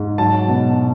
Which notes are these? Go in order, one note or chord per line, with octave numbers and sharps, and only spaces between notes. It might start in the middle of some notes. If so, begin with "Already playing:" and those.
Already playing: G#2
F#3 A5
B2